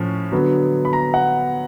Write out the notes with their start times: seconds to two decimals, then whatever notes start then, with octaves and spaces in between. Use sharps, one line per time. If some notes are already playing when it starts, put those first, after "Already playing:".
Already playing: A2 F3 C#4
0.32 D3 F#3 B3
0.85 B5
0.93 A#5
1.14 F#5